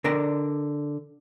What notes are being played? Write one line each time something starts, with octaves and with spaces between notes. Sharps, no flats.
D3 A#4 D5 A#5